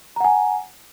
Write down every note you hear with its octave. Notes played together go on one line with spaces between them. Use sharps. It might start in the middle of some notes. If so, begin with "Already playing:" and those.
F#5 G#5 A#5